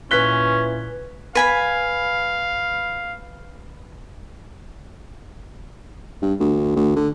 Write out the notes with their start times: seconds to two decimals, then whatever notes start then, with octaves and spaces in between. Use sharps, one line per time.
0.11 A#2 E3 C#4 B4 F#6 B6 G7
1.35 B4 F5 G#5 B5
6.22 G2
6.40 D2
6.76 D2
6.96 D3